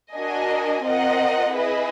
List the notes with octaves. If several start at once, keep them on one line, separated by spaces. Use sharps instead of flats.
D4 F#4 A#4 D#5 G#5
C4 F4 A#4 D#5 F#5
E4 G#4 B4 D#5